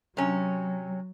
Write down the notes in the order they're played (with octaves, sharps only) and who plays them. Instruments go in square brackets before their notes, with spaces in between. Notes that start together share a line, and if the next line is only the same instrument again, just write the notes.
[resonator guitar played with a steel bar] C3 C#4 [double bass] F#3